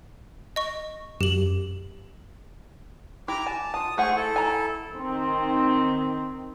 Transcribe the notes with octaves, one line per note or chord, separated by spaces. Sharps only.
D#5 C#6
F#2 G4 F#7
E4 G4 A#5 D6
G#5 A5
F4 A5 D#6
A3 G#4 C5 F#5 G#5 C#6
E4 A4
G#5 A#5
D#3 C4